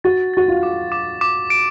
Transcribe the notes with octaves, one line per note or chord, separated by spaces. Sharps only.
F#4 A6
F#4 A6
F4
D6
D6
D6
D7